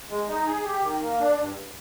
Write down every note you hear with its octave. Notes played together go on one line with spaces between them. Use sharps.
G#3
D#4
G#4
G4
D#3
A#3
D4
G2